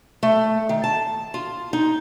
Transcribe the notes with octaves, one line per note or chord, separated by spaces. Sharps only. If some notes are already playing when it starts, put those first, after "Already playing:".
A3
D#3
A5
F4
D#4